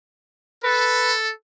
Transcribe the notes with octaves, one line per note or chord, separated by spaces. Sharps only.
A4 B4